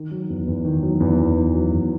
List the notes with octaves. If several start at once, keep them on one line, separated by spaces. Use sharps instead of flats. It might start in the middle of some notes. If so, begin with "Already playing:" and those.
Already playing: D#3
F#3
E2
E2
D#3
F#3
E2
E2
D#3
F#3
E2